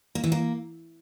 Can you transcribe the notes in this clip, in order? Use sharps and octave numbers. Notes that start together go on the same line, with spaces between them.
A#3
E3
A#3